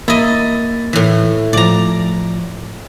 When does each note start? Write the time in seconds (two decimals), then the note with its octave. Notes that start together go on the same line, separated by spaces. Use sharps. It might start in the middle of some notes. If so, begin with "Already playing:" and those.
0.08 A#3 E4 D#5 A6
0.93 A2 E3
1.53 A2 F3 D5 A#5